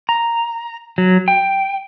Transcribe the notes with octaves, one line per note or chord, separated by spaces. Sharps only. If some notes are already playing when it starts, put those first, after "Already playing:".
A#5
F#3
G5